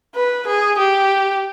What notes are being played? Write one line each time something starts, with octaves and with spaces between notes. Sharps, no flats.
B4
G#4
G4